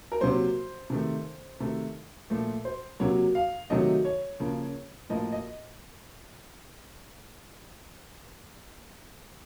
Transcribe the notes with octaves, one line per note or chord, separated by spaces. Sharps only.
A#4
C3 F#3 A#3 C5
C3 D#3 A3
C3 D#3 A3
A#2 F3 A3
C5
C3 F#3 A#3 C#5
F5
C3 D#3 F#3 A3 D#5
C#5
C#3 F3 A#3
A2 F3 A#3 D#5
D#5